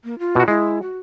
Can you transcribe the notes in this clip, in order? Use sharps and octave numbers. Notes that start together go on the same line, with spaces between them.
A#3
F4
B2 F#4
G#3 E4
F#4